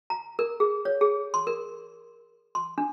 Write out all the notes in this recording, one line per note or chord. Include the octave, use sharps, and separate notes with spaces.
A#5
A#4
G#4
C#5
G#4
C6
A#4
C6
D4